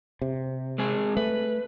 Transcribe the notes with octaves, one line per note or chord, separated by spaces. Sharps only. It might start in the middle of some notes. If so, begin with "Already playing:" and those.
C3
G#3 C4 G#4
A3 B4